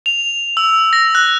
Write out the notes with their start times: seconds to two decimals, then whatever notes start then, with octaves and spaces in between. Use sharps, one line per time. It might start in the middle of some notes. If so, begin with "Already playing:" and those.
0.06 F7
0.57 E6
0.93 A#6
1.15 F#6